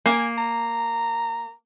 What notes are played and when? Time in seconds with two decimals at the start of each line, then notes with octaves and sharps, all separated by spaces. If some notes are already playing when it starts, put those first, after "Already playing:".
0.06 A#3 G#5
0.38 A#5